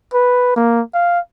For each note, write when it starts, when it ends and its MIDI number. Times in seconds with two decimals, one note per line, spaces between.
0.13 0.54 71
0.56 0.81 58
0.94 1.20 77